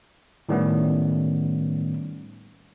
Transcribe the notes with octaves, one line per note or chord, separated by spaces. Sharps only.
A2 D#3 G3 A3 B3 C#4